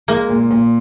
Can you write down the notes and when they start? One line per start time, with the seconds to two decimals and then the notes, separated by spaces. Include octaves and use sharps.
0.08 G#3 A#3
0.29 A#2
0.51 A#2